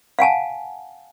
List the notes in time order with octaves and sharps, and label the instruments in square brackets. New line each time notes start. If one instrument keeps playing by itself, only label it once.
[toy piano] F5 F#5 G#5 A5